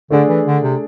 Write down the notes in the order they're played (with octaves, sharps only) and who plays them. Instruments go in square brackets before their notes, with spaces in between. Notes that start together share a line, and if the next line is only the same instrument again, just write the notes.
[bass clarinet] D3 [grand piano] A3 D4 G#4 D5
[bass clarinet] E3
D3
C3